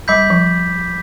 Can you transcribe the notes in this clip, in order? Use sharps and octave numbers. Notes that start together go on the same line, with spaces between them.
G3 B5 D6 G6 B6
F3